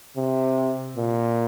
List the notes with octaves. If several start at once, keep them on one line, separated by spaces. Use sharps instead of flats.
C3
A#2